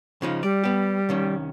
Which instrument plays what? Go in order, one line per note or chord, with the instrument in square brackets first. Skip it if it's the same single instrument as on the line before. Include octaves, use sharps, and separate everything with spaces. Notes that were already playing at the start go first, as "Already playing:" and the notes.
[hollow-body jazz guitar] C#3 F3 D#4
[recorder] G3 [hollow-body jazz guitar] D5
[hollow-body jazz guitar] B3 G4
C2 D#3 C#4